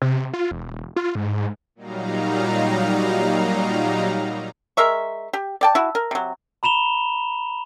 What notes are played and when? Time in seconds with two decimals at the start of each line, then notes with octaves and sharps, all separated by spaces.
0.02 C3
0.34 F4
0.51 E1
0.96 F4
1.15 G#2
1.75 A#2 F#3 G3 D#4 F5 A#5
4.77 G#3 A#4 E5 C#6
5.33 G4
5.61 D5 G5 A5
5.75 E4 F#4
5.95 A#4
6.11 C3 F#3
6.63 A#5 B5 E7 F7 G7